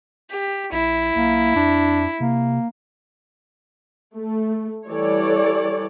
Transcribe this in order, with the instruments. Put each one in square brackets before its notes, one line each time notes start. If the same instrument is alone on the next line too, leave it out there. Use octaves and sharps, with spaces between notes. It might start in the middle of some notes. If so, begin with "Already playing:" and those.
[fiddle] G4
[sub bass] A#1 [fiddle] E4
[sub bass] B1 [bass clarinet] A#3
[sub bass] F2 [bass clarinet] D4
[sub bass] C3 [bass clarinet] A#3
[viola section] A3
E3 G3 A4 C#5 D5